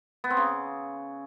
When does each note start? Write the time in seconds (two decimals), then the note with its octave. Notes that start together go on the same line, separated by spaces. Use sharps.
0.24 B3
0.30 C4
0.37 C#3